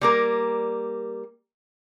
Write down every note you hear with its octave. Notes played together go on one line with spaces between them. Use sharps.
G3 A#3 A#4